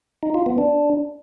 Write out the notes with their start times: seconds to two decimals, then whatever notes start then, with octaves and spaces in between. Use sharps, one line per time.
0.23 D#4
0.34 F4
0.46 B3
0.58 D4